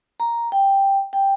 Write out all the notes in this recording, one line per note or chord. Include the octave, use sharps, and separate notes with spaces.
A#5
G5
G5